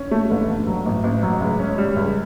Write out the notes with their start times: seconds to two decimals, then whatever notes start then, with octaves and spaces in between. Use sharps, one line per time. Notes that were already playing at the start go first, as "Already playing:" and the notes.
Already playing: C#4
0.11 A3
0.30 G1
0.49 G1
0.67 F#3
0.86 A1
1.04 A1
1.23 F#3
1.41 C#2
1.60 C#4
1.78 G3
1.96 C#2